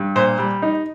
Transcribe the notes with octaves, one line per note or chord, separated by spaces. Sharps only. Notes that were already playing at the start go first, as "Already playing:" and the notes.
Already playing: G2
A#2 C5
G3
D#4